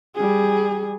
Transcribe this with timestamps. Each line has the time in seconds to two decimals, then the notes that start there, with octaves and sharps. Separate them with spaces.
0.15 G3 G#4